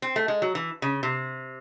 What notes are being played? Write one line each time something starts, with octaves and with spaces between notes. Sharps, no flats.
C4
A3
G#3
F#3
E3
C#3
C3